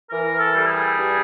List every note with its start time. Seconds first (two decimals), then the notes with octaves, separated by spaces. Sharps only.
0.10 E3 A#4
0.38 A4
0.53 G3 A4
0.66 G#4
0.95 G2